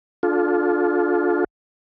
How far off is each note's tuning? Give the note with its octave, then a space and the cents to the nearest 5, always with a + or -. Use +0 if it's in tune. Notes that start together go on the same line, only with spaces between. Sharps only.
D4 +0 F4 +20 A4 -25